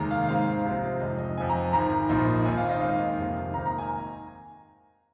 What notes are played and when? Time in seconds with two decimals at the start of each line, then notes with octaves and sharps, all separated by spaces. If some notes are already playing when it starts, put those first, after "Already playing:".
Already playing: F1 D#2 D#3 G#3 A#5
0.11 F5
0.28 G#2 G#3 C4 F5
0.64 C2 C3 F3 C4 D#4
1.00 F1 F2 F3 G#3 D#5
1.19 D#5
1.37 F2 F3 C4 G#5
1.49 A#5
1.61 G#5
1.73 G#1 G#2 D#3 A#5
2.09 A#1 G#2 F3 A#3 D#4
2.45 D#2 D#3 C4 G#5
2.57 F5
2.69 D#5
2.81 D#2 D#3 G#3 C4 D#4 F5
3.18 F1 F2 C3 D#3
3.54 G#1 G#2 D#3 A#3 D#4 A#5
3.66 A#5
3.78 G#5